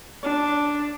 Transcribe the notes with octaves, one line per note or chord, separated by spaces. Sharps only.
D4